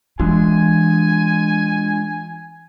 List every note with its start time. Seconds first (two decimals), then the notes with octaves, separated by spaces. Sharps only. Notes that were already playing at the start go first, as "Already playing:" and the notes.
0.20 E3 G#3 D4 F4 G#5